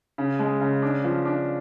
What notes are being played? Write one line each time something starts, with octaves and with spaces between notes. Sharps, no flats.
C#3
G#3
C#3
D4
F3
D4